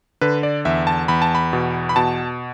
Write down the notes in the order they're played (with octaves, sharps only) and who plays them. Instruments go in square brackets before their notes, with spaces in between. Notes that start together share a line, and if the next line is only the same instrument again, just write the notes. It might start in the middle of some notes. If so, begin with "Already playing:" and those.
[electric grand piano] D3 B4
D5
E2 E5
A5
E2 B5
A5
B5
B2
B5
B2 A5